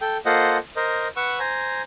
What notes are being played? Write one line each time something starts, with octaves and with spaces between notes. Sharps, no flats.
A4 G5
A#3 F4 A4 C5 D#5 F#5
A#4 C5 D#5
B4 F#5 C#6 E6
C5 G#5 A#5